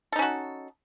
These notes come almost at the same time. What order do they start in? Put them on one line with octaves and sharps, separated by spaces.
A4 D#4 C#4 F#4